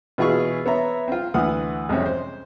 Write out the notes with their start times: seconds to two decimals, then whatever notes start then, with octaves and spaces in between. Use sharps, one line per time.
0.18 B2 E3 F4 G#4 C#6
0.66 B3 C#5 E5 A#5
1.08 C4 F4
1.34 D2 E3 F#5 D#6 F6
1.89 F2 G#2 C3 C4 C#4
2.06 C5